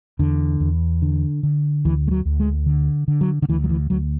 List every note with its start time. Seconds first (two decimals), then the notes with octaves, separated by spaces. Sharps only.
0.19 E2 D3
0.60 E2
1.02 D3
1.43 D3
1.85 D2 E3
2.07 G#3
2.11 F#3
2.25 D2
2.40 G#3
2.66 D3
3.08 D3
3.21 F#3
3.42 D3
3.49 D2 E3
3.64 F#3
3.70 E3
3.90 D2 F#3